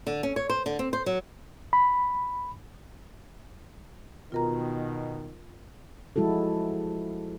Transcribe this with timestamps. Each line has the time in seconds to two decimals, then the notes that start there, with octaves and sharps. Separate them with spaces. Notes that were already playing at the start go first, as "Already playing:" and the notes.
0.07 D3
0.23 C#4
0.36 C#5
0.50 C5
0.66 D3
0.79 C4
0.93 C5
1.06 F#3
1.73 B5
4.32 B2 D#3 F4 A#4 A#5
6.16 F3 G#3 E4 F#4 A4